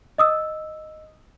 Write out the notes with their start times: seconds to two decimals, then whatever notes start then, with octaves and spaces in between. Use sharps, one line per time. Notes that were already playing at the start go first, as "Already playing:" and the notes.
0.18 D#5 D#6 E6